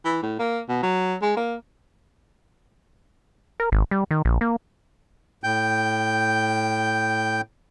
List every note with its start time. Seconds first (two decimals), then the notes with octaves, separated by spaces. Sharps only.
0.05 E3
0.22 A2
0.39 A#3
0.68 B2
0.83 F#3
1.22 G#3
1.37 A#3
3.60 A#4
3.72 G#1
3.91 G3
4.11 D#3
4.25 A#1
4.41 A#3
5.44 A2 G5 G6